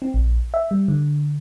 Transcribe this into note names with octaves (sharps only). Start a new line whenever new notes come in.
C4
A#1
E5
G3
D3